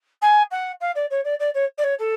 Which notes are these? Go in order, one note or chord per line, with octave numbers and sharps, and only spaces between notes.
G#5
F#5
F5
D5
C#5
D5
D5
C#5
D5
C#5
A4